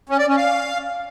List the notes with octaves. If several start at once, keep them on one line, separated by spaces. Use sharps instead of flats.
C#4
D5
C#4
F5